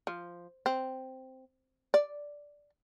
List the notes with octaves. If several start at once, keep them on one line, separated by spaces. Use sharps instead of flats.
F3
C4
D5